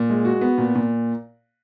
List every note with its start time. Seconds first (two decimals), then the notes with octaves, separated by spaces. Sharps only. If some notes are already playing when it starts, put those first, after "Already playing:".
Already playing: A#2
0.10 G#3
0.25 F#4
0.41 B3
0.58 A#2
0.75 A#2